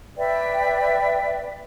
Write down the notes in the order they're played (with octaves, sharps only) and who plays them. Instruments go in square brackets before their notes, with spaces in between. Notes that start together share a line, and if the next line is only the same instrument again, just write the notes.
[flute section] B4 D5 E5 G5